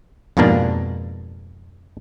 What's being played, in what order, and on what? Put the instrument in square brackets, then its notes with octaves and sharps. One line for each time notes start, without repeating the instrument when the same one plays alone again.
[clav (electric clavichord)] F2 G#2 B2 A#3 D4